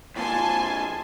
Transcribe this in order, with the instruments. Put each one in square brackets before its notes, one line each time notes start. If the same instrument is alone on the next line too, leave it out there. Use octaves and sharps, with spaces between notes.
[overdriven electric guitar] F2 A#2 [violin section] G#5 A5 C6